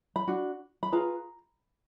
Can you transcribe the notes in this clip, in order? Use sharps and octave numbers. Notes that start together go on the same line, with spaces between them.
B5
D4 F#4
B5
F4 G#4 B4 A#5